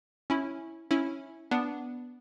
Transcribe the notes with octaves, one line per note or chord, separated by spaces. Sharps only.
C#4 E4
C#4 E4
B3 D4